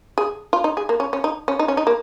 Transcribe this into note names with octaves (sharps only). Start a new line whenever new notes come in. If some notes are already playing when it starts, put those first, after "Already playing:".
G#4
F4
D#4
G#4
A#3
C#4
C#4
D#4
C#4
D#4
C#4
D#4
A#3